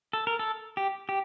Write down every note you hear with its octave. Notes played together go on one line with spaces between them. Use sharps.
A4
A#4
A4
G4
G4